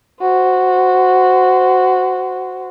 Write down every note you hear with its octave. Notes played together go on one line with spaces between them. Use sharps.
F#4 C5